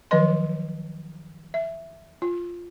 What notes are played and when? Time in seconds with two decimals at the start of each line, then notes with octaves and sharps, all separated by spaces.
0.11 D#3 F3 F#3 B4 D#5 C6
1.54 E5
2.22 F4